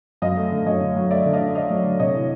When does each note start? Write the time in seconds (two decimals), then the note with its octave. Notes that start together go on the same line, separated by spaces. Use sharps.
0.22 F#2 D#5 F5
0.36 A3
0.51 D3
0.66 F#2 C#5 D#5
0.81 D3
0.96 F#3
1.11 A3 D5 E5
1.26 D3
1.33 D#5 F5
1.40 D3
1.55 A3 D#5 F5
1.70 F#3
1.85 D3
1.99 C3 C#5 D#5
2.14 E3